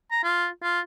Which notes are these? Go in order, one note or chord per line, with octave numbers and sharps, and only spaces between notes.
A#5
F4
F4